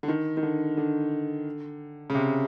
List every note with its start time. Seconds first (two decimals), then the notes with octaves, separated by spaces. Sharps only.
0.03 D3
0.08 D#3
0.37 D#3
0.43 D3
0.77 D3
2.10 C#3
2.15 C3